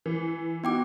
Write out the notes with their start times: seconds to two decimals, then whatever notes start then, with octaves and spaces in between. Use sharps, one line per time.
0.06 E3
0.64 B3 D#4 F#4 G5 D6